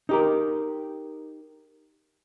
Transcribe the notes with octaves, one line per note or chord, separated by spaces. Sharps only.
D#4 G4 A#4